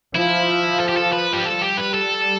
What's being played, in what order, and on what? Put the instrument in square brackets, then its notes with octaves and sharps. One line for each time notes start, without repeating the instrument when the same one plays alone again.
[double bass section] F3 [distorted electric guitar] E4
[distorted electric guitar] A4
G4
A4
B4
G4
[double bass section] G3 [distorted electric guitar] A4
[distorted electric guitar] G4
B4
A4